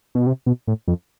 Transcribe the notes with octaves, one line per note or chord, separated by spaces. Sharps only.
B2
C3
B2
A2
F2